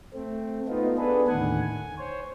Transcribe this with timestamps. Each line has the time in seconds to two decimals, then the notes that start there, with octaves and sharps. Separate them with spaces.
0.14 A3 C4
0.68 A3 B3 D#4 F4
0.98 B3 D4 G#4 A4 B4
1.28 D#2 A2 D3 D#3 F#5 G#5
1.62 G#5
1.98 C5 C#5